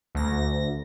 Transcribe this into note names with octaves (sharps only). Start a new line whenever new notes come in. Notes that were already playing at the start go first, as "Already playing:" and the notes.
D2 A#6